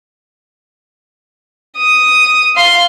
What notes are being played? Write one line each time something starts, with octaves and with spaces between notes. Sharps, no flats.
D#6
F5 C6